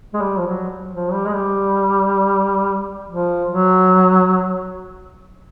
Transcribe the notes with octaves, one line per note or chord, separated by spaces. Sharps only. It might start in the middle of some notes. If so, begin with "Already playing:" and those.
G#3
G3
F3
F#3
F3
G3
G#3
G3
F3
F#3